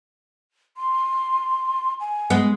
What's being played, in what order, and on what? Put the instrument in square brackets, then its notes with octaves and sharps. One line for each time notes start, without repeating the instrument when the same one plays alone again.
[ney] C6
G#5
[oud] G#3 B3